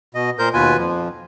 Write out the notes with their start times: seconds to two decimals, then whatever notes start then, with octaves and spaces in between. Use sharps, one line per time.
0.15 B2 D#5
0.39 A#2 A#4 C5 G6
0.54 D#2 B2 F4 B4 G#5
0.78 F2 F3